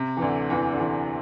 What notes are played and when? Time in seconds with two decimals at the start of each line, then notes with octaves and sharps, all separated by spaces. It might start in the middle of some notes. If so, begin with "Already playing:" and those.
Already playing: C3
0.17 E3
0.21 D2 D3
0.50 E2 E3
0.72 D3
0.79 E2 E3